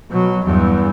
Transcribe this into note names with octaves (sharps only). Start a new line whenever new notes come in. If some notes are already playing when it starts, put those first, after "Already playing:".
B2 F#3
E2 G2